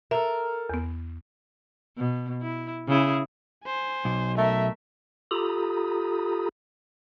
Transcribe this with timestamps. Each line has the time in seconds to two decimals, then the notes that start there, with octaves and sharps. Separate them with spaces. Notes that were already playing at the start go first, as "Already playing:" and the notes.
0.11 A4 A#4 E5
0.70 E2 B3
1.97 B2
2.41 E4
2.88 C#3 E4 G#4
3.65 C5 G#5
4.05 B1
4.38 A3 A#4 E5
5.31 F4 G4 A4 A#5 B5 D#6